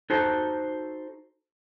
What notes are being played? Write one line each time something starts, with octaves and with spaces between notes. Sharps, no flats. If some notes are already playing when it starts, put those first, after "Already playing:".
D#4 F#4 A4 C5